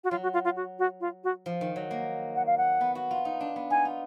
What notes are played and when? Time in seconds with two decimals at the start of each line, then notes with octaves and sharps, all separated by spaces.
0.04 F#4
0.11 F#3 F4
0.23 F#4
0.33 F4
0.45 F4
0.56 F#4
0.79 F#4
1.00 F4
1.24 F#4
1.46 F3
1.61 D#3
1.76 F#3
1.91 A#3
2.36 F#5
2.46 F5
2.58 F#5
2.81 B3
2.95 F#4
3.11 F4
3.25 D#4
3.41 D4
3.56 B3
3.70 D#4 G#5
3.85 F4